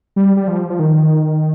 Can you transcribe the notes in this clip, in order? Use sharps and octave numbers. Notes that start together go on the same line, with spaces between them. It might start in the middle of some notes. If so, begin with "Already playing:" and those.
G3
G3
F3
F3
D#3